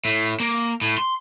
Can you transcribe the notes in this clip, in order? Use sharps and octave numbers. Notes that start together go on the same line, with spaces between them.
A2
A#3
A2
C6